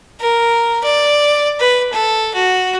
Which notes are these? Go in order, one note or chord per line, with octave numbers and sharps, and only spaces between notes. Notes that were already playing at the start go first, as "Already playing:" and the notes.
A#4
D5
B4
A4
F#4